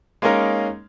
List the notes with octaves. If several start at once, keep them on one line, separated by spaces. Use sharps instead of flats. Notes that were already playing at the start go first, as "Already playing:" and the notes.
G#3 A#3 C#4 D#4 A#4